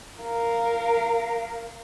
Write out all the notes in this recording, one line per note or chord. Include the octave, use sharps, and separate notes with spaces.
A#4 F5